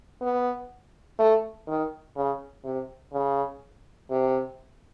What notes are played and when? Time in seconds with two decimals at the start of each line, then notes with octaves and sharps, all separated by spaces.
0.21 B3
1.19 A3
1.68 D#3
2.16 C#3
2.64 C3
3.12 C#3
4.10 C3